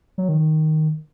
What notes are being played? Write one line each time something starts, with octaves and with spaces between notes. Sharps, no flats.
F#3
D#3
D#3